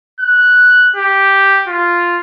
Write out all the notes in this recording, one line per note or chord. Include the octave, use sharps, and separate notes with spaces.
F#6
G4
F4